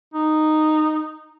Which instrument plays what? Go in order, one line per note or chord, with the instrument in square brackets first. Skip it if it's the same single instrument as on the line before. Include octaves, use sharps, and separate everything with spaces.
[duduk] D#4